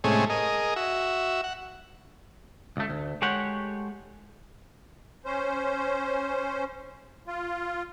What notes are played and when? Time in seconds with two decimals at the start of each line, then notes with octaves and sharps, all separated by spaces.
0.04 A2 C3 G#3 A3 C#4 G#4
0.30 G#4 A#4 D#5
0.76 F#4 E5
1.44 F#5
2.77 C#2 A3
2.89 D2
3.22 G#3 A3 G4 C#5 F#5
5.25 C#4 C5
7.27 F4